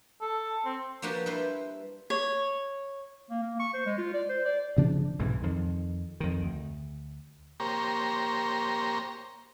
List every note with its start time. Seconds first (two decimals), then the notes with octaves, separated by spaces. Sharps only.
0.21 A4
0.65 C4
1.02 F3 A#3 D4 F#4 G4 B4
1.26 G3 E4 B4 C5
2.10 C#5
3.30 A#3
3.42 A#3
3.59 C#6
3.74 C5
3.86 G#3
3.98 F4
4.14 D5
4.29 C5
4.45 D5
4.76 D2 C#3 F3 D4
5.19 B1 G#2 C3 E3
5.43 F2 D#3
6.20 F2 D#3
6.43 D2
7.60 A#3 G4 C5 C#5 A#5